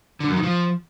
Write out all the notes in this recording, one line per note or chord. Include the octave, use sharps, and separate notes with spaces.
D3
F#2
D#3
F3